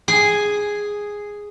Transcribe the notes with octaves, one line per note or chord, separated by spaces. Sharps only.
G#4